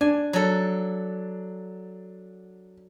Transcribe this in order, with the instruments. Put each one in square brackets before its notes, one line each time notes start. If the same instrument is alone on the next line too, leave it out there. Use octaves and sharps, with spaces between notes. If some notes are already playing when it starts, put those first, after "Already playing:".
[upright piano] D4 [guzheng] G#5
[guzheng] F#3 A4